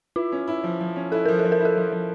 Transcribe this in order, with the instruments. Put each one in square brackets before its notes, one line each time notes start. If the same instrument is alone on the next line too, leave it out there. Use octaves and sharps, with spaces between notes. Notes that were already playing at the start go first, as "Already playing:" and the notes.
[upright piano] E4 [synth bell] F4
[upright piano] C#4
E4
F3
F3
C#4
[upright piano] E4 [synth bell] A4
[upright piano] F3 [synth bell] A#4
[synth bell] A4
[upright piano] F3
[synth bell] A#4
[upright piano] E4
[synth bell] A4
[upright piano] F3
F3